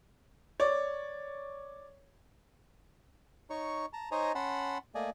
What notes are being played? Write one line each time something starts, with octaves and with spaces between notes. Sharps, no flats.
C#5 D5
D#4 C#5 C#6
A5 A#5
D#4 C5 C#5 D#5 G#5 A#5
C#4 F#5 A5 B5 C6
A3 A#3 D5 D#5 G#5